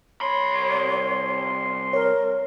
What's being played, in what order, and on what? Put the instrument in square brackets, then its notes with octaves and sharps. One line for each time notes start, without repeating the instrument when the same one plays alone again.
[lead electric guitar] C2 B5 [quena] C#5 [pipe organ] C6
[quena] A#4 [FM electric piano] C#5